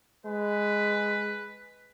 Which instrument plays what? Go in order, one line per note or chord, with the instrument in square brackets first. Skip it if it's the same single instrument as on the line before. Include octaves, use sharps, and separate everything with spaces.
[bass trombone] G#3 [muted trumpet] B4